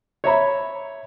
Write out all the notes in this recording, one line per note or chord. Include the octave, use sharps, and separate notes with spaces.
C#5 E5 A#5 B5